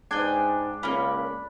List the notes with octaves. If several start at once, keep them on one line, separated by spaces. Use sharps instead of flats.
G#2 D4 G5 G#5
C#2 A#3 C#4 B5